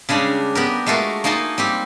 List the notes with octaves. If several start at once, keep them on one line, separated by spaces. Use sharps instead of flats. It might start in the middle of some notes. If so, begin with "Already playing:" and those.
C#3 G3 G#3 D4
B3 G4 A#4
G#3 A3 F4 F#4 A#4
A#3 D#4 G#5 A5 C6
G3 C4 G4